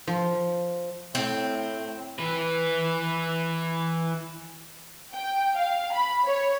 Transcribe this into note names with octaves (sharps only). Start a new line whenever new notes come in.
F3
A2 C4
E3 B4
G5
F5
B5
C#5